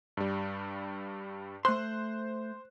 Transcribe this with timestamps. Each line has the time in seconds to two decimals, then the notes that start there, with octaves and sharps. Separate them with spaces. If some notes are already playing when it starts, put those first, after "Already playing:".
0.17 G2 G3
1.65 A3 C5 C6 F#6